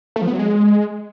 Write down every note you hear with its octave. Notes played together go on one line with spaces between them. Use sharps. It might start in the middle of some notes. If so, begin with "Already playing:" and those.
A3
F3
B3
F#3
G#3